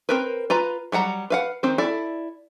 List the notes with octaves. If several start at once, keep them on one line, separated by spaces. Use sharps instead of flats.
C4 A#4 B4
F4 B4 A#5
F#3 G3 F#5 A#5
B4 F5 F#5
D#3 C4 C5
E4 A4 D5